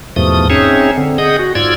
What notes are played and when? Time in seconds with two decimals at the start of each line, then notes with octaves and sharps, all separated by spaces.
0.16 E2 G#2 B2 F3 A3 D#6
0.50 C4 C#4 D#4 G#4 C#5 E5
0.97 D3 C4
1.18 G#4 D#5 F#5 D#6 G6
1.39 F#4
1.55 G#2 F4 D5 E6 G#6